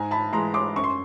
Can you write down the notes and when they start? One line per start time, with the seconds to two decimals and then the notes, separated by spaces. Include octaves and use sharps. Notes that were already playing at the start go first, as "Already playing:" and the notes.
Already playing: G#2 G#5 A#5
0.11 A5 B5
0.32 E3 G#3 A#5 C6
0.54 C6 D6
0.76 F#2 C#6
0.84 C6